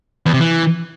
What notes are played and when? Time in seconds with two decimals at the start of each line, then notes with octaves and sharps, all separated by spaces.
0.26 E2
0.33 C3
0.41 E3